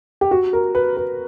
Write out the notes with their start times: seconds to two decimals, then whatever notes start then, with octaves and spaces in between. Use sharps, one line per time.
0.21 G4
0.31 F#4
0.53 A#4
0.75 B4
0.97 B4